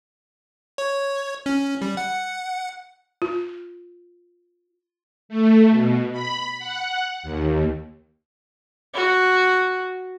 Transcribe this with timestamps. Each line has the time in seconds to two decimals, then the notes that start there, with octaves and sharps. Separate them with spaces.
0.78 C#5
1.46 C#4
1.82 G3
1.97 F#5
3.22 F4
5.29 A3
5.70 B2
6.12 B5
6.59 F#5
7.23 D#2
8.94 F#4